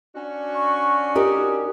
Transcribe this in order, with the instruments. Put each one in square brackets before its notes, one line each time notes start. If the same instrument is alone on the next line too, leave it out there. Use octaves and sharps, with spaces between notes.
[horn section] C#4 D4 F#4
[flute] C#6
[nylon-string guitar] D#4 G4 A#4 [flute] D#6